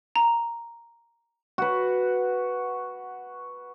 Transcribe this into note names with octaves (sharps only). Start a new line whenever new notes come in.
A#5
F#4 B4